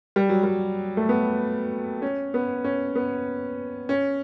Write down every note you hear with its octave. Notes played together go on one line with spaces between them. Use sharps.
G3
F#3
G3
A3
B3
C#4
B3
C#4
B3
C#4